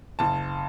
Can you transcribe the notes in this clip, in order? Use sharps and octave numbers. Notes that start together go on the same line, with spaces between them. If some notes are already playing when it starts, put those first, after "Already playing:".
F#1 A5